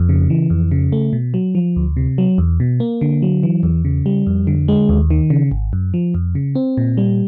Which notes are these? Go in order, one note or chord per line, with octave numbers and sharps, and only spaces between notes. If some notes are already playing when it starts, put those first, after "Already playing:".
Already playing: F2
C#3
E3
F2
C#3
A3
B2
F#3
F3
D2
C3
F#3
E2
B2
A#3
D3
F#3
E3
E2
C#3
G3
F2
D3
G#3
D#2
D#3
C#3
G#1
F#2
F3
F2
C#3
C4
A#2
G3